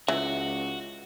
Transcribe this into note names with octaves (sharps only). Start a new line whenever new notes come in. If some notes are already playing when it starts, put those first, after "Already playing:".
C#2 E3 F#4 E5